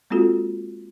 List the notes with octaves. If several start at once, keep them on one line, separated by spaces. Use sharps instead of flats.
G#3 A#3 C4 F4 F#4 A4